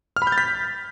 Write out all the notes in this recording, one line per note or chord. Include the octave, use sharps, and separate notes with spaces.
F6
B5
G6
A6
B6